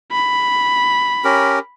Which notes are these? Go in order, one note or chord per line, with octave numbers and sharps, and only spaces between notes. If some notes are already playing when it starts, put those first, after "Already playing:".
B5
C#4 G4 A#4